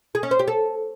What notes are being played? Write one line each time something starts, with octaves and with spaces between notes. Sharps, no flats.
G#4
C#4
C5
G4
A4